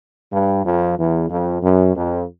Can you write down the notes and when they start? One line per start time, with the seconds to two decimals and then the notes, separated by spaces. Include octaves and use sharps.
0.33 G2
0.65 F2
0.98 E2
1.30 F2
1.62 F#2
1.95 F2